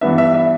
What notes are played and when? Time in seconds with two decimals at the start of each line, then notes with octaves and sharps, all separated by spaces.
0.01 G2 E3 B3 D4 E5
0.18 E5
0.34 E5